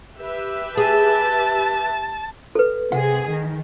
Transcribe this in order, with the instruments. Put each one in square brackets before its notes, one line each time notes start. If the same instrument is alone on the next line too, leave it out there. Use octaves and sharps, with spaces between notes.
[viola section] G4 B4 E5
[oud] G#4 [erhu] A5
[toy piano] A4 B4
[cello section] C3 G#4 [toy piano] F#5
[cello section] D#3